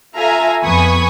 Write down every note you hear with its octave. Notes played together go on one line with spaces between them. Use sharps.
F4 A4 E5 F5 G#5 A#5
F2 B3 G#5 B5 C#6 D#6